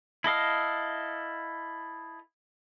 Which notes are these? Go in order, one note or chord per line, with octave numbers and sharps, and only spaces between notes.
E4 A4 D#5 F5